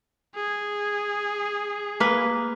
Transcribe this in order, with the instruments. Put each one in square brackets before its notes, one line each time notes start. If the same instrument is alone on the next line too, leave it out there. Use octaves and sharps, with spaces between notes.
[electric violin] G#4
[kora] A#3 B4